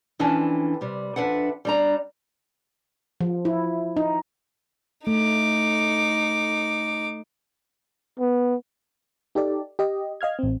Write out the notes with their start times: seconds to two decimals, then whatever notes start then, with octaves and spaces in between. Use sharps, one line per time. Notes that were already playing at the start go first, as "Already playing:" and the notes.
0.19 F2 E3 C#4 D4 G5 A5
0.81 C3 G3
1.16 F2 D4 B4 E5 F#5
1.65 G3 D4 A#5
3.21 F3
3.45 E4
3.97 D#4
5.07 A3 D#4 D6
8.20 B3
9.35 D#4 G4 A4 D5
9.79 G4 D#5
10.21 D#5 F5 F6 G#6
10.39 A1 C4